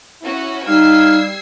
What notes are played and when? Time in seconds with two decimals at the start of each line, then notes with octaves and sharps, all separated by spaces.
0.22 C#4 E4 F#4
0.67 G3 D#4 F5 E6 G#6 C7